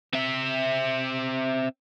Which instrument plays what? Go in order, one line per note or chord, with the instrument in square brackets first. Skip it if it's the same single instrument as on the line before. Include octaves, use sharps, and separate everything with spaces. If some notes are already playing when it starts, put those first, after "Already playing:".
[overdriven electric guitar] C4 E5